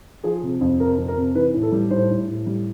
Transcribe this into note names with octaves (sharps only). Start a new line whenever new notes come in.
F3 G#4
C3
F2
C3 A#4
F2
A#4
C3
E3 B4
A2
A4
G3
A2 C5
A2
A2
G3